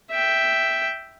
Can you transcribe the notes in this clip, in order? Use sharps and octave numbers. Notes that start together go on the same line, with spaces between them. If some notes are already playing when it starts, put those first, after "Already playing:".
E5 G5